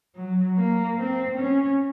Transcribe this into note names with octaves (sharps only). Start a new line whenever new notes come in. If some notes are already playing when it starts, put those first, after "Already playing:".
F#3
A#3
C4
C#4